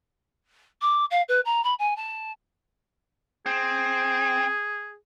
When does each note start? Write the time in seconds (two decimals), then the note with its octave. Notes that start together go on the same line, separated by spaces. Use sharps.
0.81 D6
1.11 F5
1.28 B4
1.45 A#5
1.64 B5
1.79 G#5
1.96 A5
3.46 C4 G#4